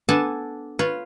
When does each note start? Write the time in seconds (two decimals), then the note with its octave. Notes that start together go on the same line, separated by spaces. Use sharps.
0.09 B3 D4 A4 G#5 A5
0.79 F4 B4 C#5